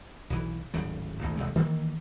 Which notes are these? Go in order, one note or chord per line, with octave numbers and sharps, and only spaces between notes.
B1 E3
D1 G#1 C#3 F#3
G#1 D2 A#2
D#1 A#1 C3 G#3
D#3 E3 A#3